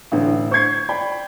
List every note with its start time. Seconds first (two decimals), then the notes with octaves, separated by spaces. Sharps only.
0.12 A1 D3
0.51 C5 C#6 G6 G#6 C7
0.89 D5 G5 B5